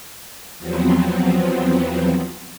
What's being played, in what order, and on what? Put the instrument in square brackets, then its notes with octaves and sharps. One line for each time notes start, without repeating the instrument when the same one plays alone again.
[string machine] E2 F3 F#3 B3 C4